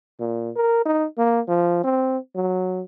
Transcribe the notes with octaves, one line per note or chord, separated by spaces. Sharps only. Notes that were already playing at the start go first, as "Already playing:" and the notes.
A#2
A#4
D#4
A#3
F3
C4
F#3